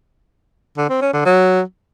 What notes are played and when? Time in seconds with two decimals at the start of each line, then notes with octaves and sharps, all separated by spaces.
0.78 D3
0.89 C4
1.01 C#4
1.13 D3
1.25 F#3